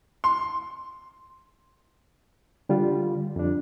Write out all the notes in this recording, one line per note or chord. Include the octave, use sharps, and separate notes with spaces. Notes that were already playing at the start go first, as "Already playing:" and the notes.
C6
D3 G3 F4
F2 D4